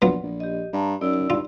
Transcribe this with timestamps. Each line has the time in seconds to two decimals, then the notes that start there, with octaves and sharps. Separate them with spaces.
0.02 A#1 F#3 B3 F4
0.23 A#1
0.40 G4 D#5
0.73 G2 A5 A#5
1.01 F#2 D#4 D5 E6
1.30 G2 F4